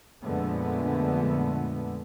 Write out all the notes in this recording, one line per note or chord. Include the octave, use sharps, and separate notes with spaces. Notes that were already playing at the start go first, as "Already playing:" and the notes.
F2 A#2 D3 G#3 A3 B3